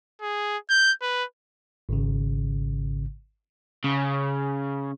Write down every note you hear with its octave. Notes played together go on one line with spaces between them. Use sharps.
G#4
G6
B4
G#1 G#2 C#3
C#3